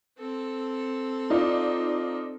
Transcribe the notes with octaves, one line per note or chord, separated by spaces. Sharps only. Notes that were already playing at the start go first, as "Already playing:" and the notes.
C4 A4
D#4 F4 D5